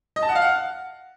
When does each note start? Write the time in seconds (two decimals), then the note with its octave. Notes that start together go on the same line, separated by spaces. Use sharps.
0.16 D#5
0.23 A5
0.29 F#5
0.35 F5
0.42 F#5